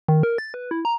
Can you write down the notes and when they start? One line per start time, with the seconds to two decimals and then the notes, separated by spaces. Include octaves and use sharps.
0.08 D#3
0.23 A#4
0.38 A6
0.54 B4
0.71 E4
0.85 A#5